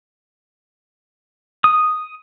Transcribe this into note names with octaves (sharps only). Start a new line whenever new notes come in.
D#6